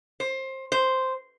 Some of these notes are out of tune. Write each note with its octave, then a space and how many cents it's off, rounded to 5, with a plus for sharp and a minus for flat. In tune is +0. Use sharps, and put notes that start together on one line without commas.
C5 +20
C5 -5